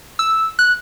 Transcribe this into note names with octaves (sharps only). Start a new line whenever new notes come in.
E6
F#6